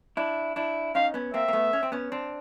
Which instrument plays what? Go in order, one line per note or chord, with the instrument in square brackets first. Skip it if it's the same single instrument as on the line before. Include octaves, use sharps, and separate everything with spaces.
[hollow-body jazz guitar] D4 E4
D4 E4
[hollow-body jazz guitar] C#4 D#4 [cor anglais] F5
[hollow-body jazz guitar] B3 C#4
[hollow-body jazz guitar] A#3 C4 [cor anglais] E5
[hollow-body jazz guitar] A#3
A3 B3
C#4
C4
B3 C#4
C4 D4